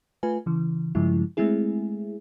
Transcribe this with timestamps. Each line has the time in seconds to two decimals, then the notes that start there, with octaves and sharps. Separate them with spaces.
0.23 A3 F4 B4 G#5
0.46 C#3 E3
0.95 G2 C#3 F3 G#3 E4
1.37 G#3 A3 C4 E4 G#4